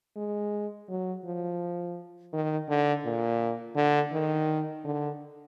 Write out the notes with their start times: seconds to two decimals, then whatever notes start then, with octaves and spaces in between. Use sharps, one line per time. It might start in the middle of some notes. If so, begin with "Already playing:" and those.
0.16 G#3
0.89 F#3
1.25 F3
2.33 D#3
2.68 D3
3.05 A#2
3.76 D3
4.13 D#3
4.84 D3